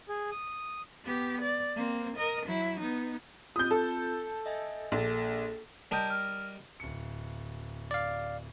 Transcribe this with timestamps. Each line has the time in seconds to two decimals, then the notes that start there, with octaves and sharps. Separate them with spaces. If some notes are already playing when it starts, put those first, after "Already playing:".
0.09 G#4
0.31 D#6
1.04 B3 G4
1.41 D5
1.76 A#3 C4
2.16 A#4 D#5
2.46 F#3 E4
2.79 B3 D#4
3.56 C4 F4 D#6 G6
3.71 A4
4.46 D#5 E5 G#5
4.92 A#1 A#3 A4 A6
5.91 G3 A#4 D#5 A5 G6
6.10 F6
6.80 D1 C#7
7.91 D5 F5